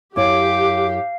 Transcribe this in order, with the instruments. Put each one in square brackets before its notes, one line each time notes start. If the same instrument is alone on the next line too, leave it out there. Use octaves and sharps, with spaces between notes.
[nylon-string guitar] F#2 E4 C#5 [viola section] G4 [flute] F5 [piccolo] D6